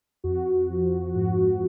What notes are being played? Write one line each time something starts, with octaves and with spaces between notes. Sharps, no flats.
F2 F#4
F3
G#2 F#4